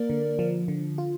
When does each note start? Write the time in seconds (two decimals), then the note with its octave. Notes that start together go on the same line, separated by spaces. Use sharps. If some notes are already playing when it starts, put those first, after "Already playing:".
Already playing: A#3 A#4 D5
0.10 D3
0.39 F3
0.68 D3
0.98 F4